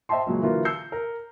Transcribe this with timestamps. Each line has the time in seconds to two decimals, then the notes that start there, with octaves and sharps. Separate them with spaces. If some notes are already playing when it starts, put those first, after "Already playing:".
0.09 C5 D#5 E5 G5 A5 C6
0.26 F#1 A#2 F#3 G#3
0.41 D3 E3 F#3 A#3 F4 A#4
0.65 E6 G6 C7 C#7
0.92 A#4